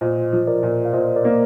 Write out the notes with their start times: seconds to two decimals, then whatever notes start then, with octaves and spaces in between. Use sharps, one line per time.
0.01 A#2 C5 D#5
0.32 F3
0.47 A#4 D5
0.63 A#2
0.85 F5
0.93 A#2 C5 D#5
1.16 A#4 D5
1.25 A#3